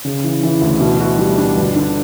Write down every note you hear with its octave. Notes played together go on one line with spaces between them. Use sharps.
C#3
E3
E3
D2
B2
F#4
G3
D4
G1
D3